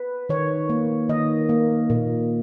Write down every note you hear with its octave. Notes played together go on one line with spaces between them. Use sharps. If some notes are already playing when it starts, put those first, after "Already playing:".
Already playing: B4
D#3 C#5
A#3
D#3 D#5
A#3
A#2